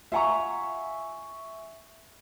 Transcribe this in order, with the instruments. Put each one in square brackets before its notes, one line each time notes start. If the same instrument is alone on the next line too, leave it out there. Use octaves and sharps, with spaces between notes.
[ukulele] F4 F#5 A#5 [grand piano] E5 G#5 C#6